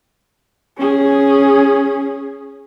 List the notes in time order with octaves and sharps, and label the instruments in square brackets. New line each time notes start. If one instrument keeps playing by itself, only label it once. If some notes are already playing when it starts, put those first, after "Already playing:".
[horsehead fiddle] C#4 G#4